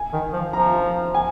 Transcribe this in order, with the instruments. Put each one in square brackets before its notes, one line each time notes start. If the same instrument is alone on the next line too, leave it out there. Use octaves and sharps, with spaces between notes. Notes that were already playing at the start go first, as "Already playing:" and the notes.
Already playing: [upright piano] G#5
[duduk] D#3
F3
[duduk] F3 [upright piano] A#5
[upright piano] G#5